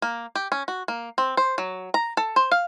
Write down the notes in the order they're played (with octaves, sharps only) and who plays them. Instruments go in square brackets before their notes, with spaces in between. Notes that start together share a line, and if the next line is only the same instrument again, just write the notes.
[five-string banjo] A#3
G4
C#4
F#4
A#3
C4
C5
F#3
A#5
A4
C5
F5